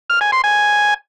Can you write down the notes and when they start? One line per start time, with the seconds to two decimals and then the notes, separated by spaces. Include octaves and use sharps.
0.10 F6
0.21 G#5
0.32 C6
0.44 G#5